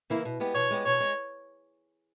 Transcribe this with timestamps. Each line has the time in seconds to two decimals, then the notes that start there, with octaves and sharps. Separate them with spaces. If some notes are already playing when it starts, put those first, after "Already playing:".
0.10 C#3 E3 A#3 E4
0.25 B2
0.40 G#3 B3 G4
0.55 B2 C#5
0.71 G#3 B3 G4
0.86 B2 C#5
1.00 G#3